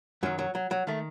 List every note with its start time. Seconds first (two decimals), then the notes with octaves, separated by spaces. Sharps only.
0.23 F#2 D#3 F#3
0.39 F#3
0.55 F#3
0.71 F#3
0.87 D#3 A3